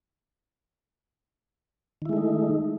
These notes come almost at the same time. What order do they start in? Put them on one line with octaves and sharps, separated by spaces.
D#3 E4 G#3 A3 D#4